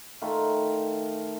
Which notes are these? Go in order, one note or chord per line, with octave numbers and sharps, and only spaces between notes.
D#3 A3 F4 B5